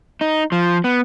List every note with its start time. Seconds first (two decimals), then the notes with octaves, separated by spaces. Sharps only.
0.21 D#4
0.52 F3
0.84 B3